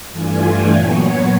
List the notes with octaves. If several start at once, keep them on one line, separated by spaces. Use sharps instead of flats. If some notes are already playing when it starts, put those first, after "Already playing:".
G2 E3 A3 D4 F4 G#5
G5
A#2 F#3 B3 C#5